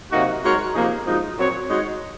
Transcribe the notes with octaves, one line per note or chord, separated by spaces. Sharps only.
C3 F#3 A#3 D#4 F#4
G#3 D#4 F#4 A#4 C#5
C3 F3 A#3 D#4 G#4
F#2 F3 G#3 D#4
A#2 F#3 C4 F#4 C#5
G#3 D#4 F#4 C#5